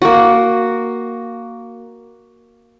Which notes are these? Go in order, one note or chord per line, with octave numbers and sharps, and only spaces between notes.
A#3 F#4